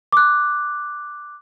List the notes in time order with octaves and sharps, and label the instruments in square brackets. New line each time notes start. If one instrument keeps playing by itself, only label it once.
[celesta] D6 F#6